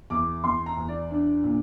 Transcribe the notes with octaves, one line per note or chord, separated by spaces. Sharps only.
E2 D6
E2 C6
A#5
E2
D5
D4
A#2